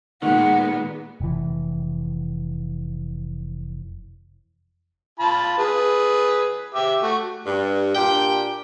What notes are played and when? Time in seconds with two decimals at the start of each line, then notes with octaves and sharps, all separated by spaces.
0.22 A#2 D#3 G#3 B3 F#5
1.21 F1 E3
5.20 F4 A5 B5
5.58 G#4 B4
6.74 G4 E5 D6
7.02 A3 F#4
7.46 G2
7.95 A#2 D4 G4 G5